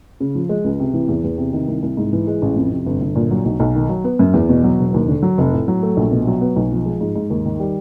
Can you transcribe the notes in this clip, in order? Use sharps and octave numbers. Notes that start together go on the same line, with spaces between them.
C#3
F3
G#3
C#2
C3
E3
E2
E2
C3
D#3
C2
C2
G#2
E3
G#3
A1
F2
C3
G1
G1
A#2
F#3
B1
B1
D#3
F#3
B3
F#2
E2
B2
F#3
E1
D#2
D3
F#3
F1
A2
F#3
A3
A#1
B2
F#3
B3
B1
F3
G#3
G#2
G#2
D#2
D#3
G3